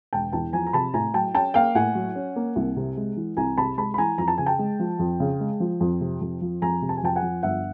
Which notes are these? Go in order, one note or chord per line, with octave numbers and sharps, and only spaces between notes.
E1 G5 A5
E2 G5 A5
F3 G#5 A#5
A#5
C3 A5 B5
A2 G#5 A#5
F#3 G5 A5
C#4 G5 A5
A#3 F5 G5
A2 F#5 G#5
F#3
C#4
A#3
C2
C3
G#3
E3
C2 G#5 A#5
C3 A5 B5
G#3 A5 B5
B5
E3 G#5 A#5
F2 A#5
A5
C#3 G#5
G5 A5
G#3
F3
F2
C#3
G#3
F3
F2
C3
F2
F3
F2 G#5 A#5
C3
A5
G#5
F2 G5 A5
F#5 G#5
F3
G1 E5 F#5